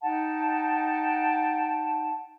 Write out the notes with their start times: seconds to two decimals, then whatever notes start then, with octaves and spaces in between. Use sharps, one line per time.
0.02 D#4 F#5 G5 A5